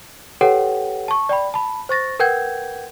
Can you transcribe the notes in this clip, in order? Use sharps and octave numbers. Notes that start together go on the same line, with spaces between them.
G4 A4 B4 C#5 F#5 G5
A5 C#6
D5 G5 B5
A5 B5
C5 C#6 A6 A#6
A#4 B4 F#5 G5 G6 G#6